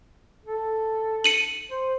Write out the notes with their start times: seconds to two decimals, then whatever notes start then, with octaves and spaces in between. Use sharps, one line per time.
0.45 A4
1.24 C#7 D#7 F#7
1.71 C5